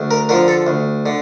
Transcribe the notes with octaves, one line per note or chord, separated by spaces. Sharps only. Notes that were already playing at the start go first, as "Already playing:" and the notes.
Already playing: D2
A#4
D3 F3 A#4
A4
D2
D3